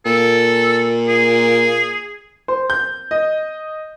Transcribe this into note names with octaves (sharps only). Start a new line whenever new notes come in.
A#2 A4
G#4
C5
G6
D#5